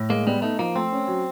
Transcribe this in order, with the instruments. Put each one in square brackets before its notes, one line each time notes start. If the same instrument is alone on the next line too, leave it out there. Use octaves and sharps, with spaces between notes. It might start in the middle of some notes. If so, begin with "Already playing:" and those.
Already playing: [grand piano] A2
[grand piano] G#3 [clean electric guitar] A#3
[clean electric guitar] G3 [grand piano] B3
[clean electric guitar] A3 [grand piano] D#4
[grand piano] F3 [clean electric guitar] A#3
[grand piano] A3 [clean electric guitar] C4
[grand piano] C#4
F#3